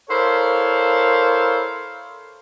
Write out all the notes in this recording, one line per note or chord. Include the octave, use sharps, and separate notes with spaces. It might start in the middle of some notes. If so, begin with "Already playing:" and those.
E4 A4 A#4 C5 C#5 F5